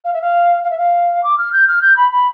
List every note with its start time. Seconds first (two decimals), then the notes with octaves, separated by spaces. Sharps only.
0.04 F5
0.13 E5
0.21 F5
0.64 F5
0.70 E5
0.78 F5
1.23 D6
1.38 F6
1.52 G6
1.68 F6
1.82 G6
1.96 B5
2.11 B5